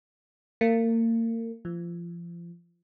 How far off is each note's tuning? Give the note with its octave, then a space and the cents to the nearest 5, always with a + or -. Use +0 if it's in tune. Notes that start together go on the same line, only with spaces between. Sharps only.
A#3 -35
F3 -30